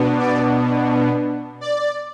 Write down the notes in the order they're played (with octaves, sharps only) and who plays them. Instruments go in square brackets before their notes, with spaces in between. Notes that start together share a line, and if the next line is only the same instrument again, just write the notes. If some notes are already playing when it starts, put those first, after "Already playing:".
Already playing: [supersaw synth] B2 B3 D4
D5
D5